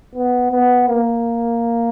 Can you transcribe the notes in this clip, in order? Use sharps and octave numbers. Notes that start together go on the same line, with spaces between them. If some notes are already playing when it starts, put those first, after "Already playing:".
B3
B3
A#3